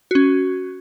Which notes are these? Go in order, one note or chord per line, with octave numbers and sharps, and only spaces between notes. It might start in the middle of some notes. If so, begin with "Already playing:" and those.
C#4 F#4